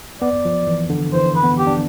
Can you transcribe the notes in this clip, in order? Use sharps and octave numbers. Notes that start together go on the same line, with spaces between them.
B3 D5
F3
E3
D3
E3 C5
B4
B3
G4
D4